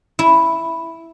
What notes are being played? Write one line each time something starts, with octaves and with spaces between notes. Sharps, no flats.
E4